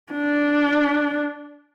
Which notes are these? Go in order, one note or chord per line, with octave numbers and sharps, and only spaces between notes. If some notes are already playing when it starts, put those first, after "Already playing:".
D4